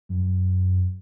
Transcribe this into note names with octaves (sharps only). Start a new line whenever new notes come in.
F#2